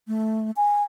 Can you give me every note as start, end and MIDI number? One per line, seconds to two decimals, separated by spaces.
0.08 0.51 57
0.57 0.83 80